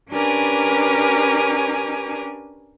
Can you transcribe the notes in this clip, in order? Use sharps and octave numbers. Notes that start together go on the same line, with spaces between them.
C#4 D4 G4 A#4 B4 G#5